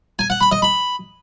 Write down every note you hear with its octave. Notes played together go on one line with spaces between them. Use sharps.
G#5
F#5
B5
D#5
B5